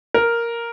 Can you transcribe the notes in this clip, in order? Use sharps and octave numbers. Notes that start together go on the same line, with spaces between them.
A#4